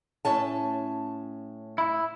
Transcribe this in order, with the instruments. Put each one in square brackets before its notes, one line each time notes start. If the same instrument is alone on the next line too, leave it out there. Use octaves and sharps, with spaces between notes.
[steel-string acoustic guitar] A2 C#4 A5
[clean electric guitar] E4